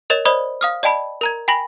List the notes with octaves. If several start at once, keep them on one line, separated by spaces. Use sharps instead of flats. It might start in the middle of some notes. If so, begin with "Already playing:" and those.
A#4 C#5 D#5 A6 E7
C5 D5 D#5 B5 D#6
F5 D#6 F6
D5 D#5 G5 A5 B5
A#4 A#5 G#6
G5 G#5 B5 A#6 F#7